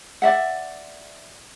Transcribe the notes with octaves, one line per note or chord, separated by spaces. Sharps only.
D5 E5 F#5